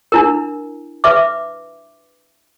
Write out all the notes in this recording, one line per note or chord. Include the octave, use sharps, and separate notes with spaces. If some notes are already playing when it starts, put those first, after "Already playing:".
D4 E4 A#4
B4 E5 D6